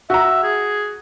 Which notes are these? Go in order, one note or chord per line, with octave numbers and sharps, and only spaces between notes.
F#4 E5 A#5
G#4